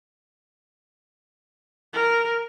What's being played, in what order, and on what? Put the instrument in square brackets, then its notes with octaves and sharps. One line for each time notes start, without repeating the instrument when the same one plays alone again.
[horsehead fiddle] A#4